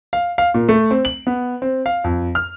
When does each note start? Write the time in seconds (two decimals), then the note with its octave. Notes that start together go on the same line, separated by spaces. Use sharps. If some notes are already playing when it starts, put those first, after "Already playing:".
0.13 F5
0.38 F5
0.54 A#2
0.69 A3
0.91 C4
1.05 F#7
1.27 B3
1.62 C4
1.86 F5
2.04 F2
2.35 F6